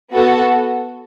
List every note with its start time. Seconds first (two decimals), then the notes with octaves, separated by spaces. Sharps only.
0.13 B3 F#4 A4